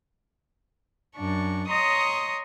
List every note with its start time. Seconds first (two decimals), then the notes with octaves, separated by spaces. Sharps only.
1.16 F#2 D4 C#6
1.68 C#5 D#5 A#5 C6 C#6 D#6